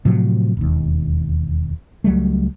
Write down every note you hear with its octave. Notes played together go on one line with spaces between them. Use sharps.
A2 C3 F3 F#3
E1 D#2
C#2 F#3 G3 A3